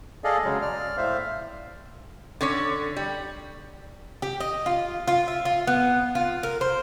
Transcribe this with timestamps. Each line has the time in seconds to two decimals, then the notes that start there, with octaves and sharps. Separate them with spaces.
0.24 G#4 A4 D5 D#5 F5
0.44 C#3 F#3 G#3
0.62 D5 F6
0.97 A2 C5 E5 F5
2.41 D3 C#4 C#5
2.96 G3
4.22 G4
4.40 D#5
4.66 F4
5.08 F4
5.28 E5
5.45 F4
5.67 B3
6.15 F4
6.43 A#4
6.61 C5